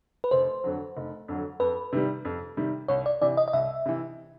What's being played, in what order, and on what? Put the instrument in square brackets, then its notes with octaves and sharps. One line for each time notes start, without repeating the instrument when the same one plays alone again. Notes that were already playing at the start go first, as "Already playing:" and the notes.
[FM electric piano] B4
[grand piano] F1 [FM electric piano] C5
[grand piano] F2 D3 F#3
F1
F2 D3 F#3
[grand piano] F2 [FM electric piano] B4
[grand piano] C3 D#3 G3
F2
C3 D#3 G3
[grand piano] C2 [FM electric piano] C#5
[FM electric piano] D5
[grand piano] C3 E3 [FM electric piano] D5
[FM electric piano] D#5
D#5
[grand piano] C2 [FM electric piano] E5
[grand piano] C3 E3